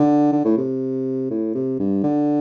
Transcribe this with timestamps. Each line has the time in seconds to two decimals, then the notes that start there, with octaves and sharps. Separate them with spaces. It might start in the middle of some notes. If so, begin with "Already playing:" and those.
Already playing: D3
0.33 D3
0.45 A2
0.57 C3
1.31 A2
1.55 C3
1.79 G2
2.04 D3